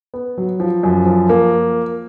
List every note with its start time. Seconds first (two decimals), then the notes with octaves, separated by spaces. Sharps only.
0.14 B3
0.38 F#3
0.60 F3
0.83 F#2
1.06 F3
1.30 A#3